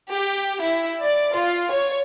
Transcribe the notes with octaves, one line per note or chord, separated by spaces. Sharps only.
G4
E4
D5
F4
C#5